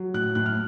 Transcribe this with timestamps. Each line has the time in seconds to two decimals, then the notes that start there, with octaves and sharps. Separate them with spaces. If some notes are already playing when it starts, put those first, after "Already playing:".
Already playing: F#3
0.14 A2 F#6
0.35 A2 F#6
0.46 F6